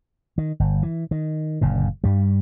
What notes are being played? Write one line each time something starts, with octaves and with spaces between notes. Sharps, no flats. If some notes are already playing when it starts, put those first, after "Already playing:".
D#3
G1
E3
D#3
F#1 A#2 D3
G2 G3